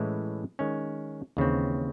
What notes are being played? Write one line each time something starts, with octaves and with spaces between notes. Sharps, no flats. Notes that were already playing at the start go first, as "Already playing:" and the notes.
Already playing: A2 E3 G#3 C#4 E4
D#3 G#3 C#4
D#2 C#3 E3 C4